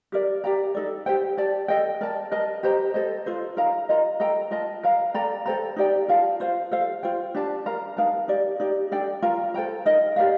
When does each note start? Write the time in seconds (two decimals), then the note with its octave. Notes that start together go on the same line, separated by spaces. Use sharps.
0.12 G4 A#4 D5
0.44 G4 D5 G5 A#5
0.75 D#4 A4 D5
1.06 G4 C5 G5
1.37 G4 D5 A5
1.68 A4 D#5 G5
2.01 A#4 D5 A5
2.32 A#4 D#5 A5
2.63 G4 C5 D#5 A#5
2.94 A4 C5 D#5
3.26 F4 A4 C5
3.57 D#4 A#4 F5 A#5
3.89 F4 A#4 D#5 A#5
4.20 A4 D#5 G5 A#5
4.51 F4 A#4 D#5 A5
4.83 A#4 F5 A#5
5.14 A4 D5 G5 A#5
5.46 A4 C5 G5 A#5
5.76 D#4 G4 D5 G5
6.08 F4 A#4 F5 A5
6.40 F4 C5 F5
6.71 A4 C5 F5
7.03 F4 C5 G5
7.35 D4 G4 D5 A5
7.66 A#4 F5 A#5
7.97 D#4 A#4 F5 A5
8.28 D#4 G4 D5
8.60 D#4 G4 D5
8.92 D4 A4 D5 G5
9.22 F4 A#4 F5 A#5
9.54 A4 C5 G5 A#5
9.86 D#4 A#4 D#5
10.16 G4 A#4 D5 F5